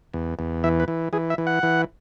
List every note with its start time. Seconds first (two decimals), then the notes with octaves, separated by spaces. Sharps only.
0.14 E2
0.39 E2
0.64 E3 E5
0.80 B4
0.88 E3
1.13 E3 G#4
1.30 E5
1.38 E3
1.47 F#5
1.63 E3